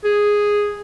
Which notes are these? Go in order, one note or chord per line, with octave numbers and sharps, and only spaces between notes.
G#4